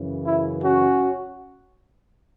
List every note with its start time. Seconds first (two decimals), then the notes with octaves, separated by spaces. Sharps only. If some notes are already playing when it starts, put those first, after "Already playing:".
Already playing: F#2 C#3 E3
0.24 E4
0.62 C#4 F#4